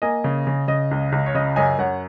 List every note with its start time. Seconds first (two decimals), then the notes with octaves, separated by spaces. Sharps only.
0.02 A#3 D#5 G#5
0.24 C#3
0.47 C#3
0.68 C#3 D#5
0.91 C#2
1.12 C#2
1.26 C#5
1.35 C#3 D#5
1.56 F#2 D#5 G#5
1.78 F#2 C#5 F#5